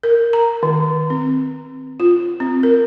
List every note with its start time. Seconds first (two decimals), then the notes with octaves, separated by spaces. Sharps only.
0.03 A#4
0.33 A#5
0.63 D#3
1.10 C4
2.00 F4
2.40 C4
2.63 A#4